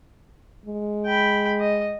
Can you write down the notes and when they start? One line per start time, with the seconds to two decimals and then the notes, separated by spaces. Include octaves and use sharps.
0.65 G#3
1.06 G5 B5
1.60 D#5